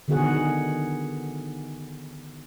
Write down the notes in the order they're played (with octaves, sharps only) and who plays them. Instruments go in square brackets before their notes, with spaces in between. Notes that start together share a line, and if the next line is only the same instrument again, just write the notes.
[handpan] D3 D#3 B3 F#4 G#4 F#5